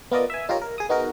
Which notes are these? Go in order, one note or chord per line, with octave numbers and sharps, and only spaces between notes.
B3 F4 A#4 D5 D#5
E5 G#5
D#4 F4 G4 A#4 C#5
A#4
G#4 D#6
B3 D#4 F#4 G#4 A#4